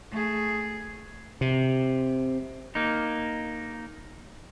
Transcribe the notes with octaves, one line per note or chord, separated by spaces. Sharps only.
A3 G#4
C3
A#3 D#4